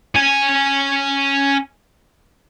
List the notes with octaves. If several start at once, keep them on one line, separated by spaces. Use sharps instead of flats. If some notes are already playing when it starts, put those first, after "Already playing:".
C#4 G#5